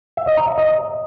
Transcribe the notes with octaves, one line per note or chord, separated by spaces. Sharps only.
E5
D#5
A#5
E5
D#5